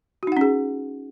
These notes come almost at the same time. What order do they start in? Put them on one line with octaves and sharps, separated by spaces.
F#4 D#4 F#5 C#4 G#4